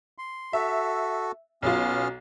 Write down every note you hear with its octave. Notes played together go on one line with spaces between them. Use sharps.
C6
F#4 A4 E5
B1 F#3 B3 C#4 F4 F6